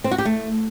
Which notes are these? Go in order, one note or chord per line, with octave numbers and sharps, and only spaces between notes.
C4
F#4
G4
A3